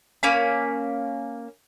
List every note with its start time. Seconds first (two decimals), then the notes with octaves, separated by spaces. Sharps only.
0.23 A#3 C#4 B5